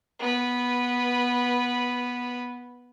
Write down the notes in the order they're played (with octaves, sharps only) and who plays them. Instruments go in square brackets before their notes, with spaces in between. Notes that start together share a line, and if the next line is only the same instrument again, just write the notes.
[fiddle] B3 B4